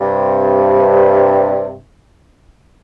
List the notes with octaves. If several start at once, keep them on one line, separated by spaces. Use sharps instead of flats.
G2 C3